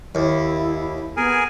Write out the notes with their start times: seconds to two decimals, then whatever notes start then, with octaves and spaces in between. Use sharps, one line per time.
0.15 D#2 E4
1.17 B3 G#4 A#4 G#5